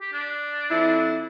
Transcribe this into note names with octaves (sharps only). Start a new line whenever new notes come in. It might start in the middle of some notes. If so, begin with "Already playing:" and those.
G4
D4
F2 E4